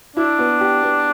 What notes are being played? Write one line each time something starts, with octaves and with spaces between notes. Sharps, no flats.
D4 E4
B3
G4
B3